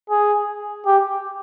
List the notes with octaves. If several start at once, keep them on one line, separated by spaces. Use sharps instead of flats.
G#4
G4